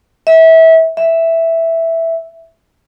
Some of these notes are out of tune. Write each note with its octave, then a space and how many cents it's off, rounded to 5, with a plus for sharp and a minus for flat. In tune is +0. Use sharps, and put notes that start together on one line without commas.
E5 -25
E5 +0